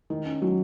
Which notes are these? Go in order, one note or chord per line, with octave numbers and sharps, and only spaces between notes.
D#3
C#4
F#3